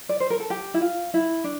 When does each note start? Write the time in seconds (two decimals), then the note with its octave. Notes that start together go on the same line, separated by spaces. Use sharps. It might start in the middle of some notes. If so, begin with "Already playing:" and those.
0.09 D5
0.20 C5
0.30 A#4
0.40 A4
0.50 G4
0.74 E4
0.81 F4
1.14 E4
1.44 D4